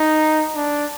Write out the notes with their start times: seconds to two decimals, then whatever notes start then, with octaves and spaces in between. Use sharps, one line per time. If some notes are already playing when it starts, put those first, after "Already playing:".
Already playing: D#4
0.56 D4